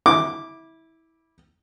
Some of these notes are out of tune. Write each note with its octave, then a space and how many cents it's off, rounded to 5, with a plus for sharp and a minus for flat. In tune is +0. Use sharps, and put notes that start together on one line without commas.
E4 -20 D6 +0